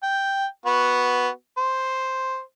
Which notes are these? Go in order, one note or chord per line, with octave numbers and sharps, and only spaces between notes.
G5
B3 F#4
C5